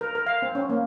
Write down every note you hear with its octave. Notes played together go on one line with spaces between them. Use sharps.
A#4
A#4
F5
C4
C#4
A#3